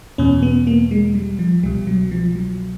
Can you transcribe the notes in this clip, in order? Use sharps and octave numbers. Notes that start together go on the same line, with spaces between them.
E2 B2 C#4
B3
A#3
G#3
G3
F3
C2 B2 G3
F#3
F3
F#3